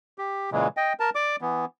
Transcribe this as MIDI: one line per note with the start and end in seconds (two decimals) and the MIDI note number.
0.18 0.50 67
0.52 0.68 46
0.52 0.68 49
0.52 0.68 52
0.52 0.68 56
0.77 0.93 75
0.77 0.93 79
1.00 1.10 70
1.00 1.10 81
1.15 1.36 74
1.15 1.36 86
1.41 1.65 52
1.41 1.65 59